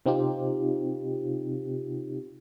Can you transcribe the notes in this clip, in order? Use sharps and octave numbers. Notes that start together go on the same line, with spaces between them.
C3 C4 D#4 F4 G4